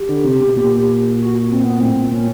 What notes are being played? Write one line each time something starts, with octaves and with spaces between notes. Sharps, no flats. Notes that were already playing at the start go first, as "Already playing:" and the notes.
Already playing: G4
D3
C3
B2
A#2
F#4
C4
B3
A2 C4
A#2
A#2 C#4